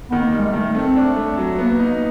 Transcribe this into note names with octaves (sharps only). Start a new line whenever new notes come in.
D#3 B3
A#3
G3 G#3
A3
D#3
A3 C4
D4
A3
F#3
A#3 B3
D#4